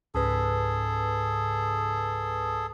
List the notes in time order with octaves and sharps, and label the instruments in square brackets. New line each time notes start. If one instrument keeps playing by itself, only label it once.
[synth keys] C#2 G#2 B4 [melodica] G#4 A4